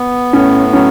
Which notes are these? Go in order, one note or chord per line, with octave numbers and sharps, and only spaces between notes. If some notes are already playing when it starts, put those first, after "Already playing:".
Already playing: B3
A2 C#4
F#3 C#4